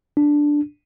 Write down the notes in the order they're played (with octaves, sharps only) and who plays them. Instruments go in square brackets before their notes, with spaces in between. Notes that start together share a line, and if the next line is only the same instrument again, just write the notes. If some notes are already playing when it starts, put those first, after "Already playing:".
[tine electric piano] D4